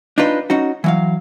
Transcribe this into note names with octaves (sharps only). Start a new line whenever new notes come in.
D4 D#4 F4 B4
C#4 D#4 F#4
E3 F#3 F5